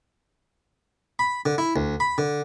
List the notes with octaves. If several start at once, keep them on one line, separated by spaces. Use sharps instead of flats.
B5
D3
E4
D2
B5
D3